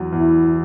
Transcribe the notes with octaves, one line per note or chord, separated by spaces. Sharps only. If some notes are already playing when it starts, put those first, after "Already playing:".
Already playing: E2 F#3
E2 E4